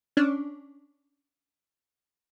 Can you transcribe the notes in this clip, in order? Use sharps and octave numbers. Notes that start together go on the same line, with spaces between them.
C#4 D4